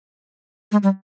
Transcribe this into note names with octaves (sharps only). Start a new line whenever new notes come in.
G#3
G3